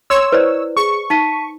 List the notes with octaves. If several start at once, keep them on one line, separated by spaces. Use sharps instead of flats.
C#5 C6 E6
E4 B4 C5 D5
G#4 C#6
D#4 A5 B6 D#7